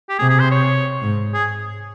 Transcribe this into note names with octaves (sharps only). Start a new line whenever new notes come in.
G4
C3 G#4
G#4
C5
C#5
G#2
G#4